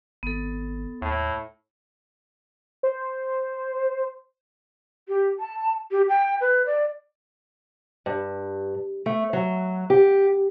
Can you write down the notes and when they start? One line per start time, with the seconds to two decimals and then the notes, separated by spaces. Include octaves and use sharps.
0.23 G#1 B3 A4
1.02 D#2 A2
2.83 C5
5.08 G4
5.40 A5
5.91 G4
6.09 G5
6.41 B4
6.66 D5
8.06 G2
9.06 A3
9.33 F#3
9.90 G4